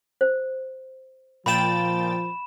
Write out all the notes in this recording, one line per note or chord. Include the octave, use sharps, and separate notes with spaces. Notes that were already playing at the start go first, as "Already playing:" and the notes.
C5
A#2 F3 G5 B5 A6 E7